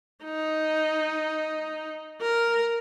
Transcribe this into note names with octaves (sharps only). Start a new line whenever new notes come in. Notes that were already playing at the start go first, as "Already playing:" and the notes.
D#4
A#4